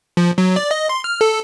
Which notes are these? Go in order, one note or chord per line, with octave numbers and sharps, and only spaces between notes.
F3
F#3
D5
D#5
C6
F6
A4